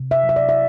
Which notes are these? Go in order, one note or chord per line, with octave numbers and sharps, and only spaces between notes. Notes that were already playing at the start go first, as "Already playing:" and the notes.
Already playing: C3
E5
F#3
E5
D5
E5